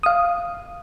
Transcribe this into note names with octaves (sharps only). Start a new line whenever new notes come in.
F5 D#6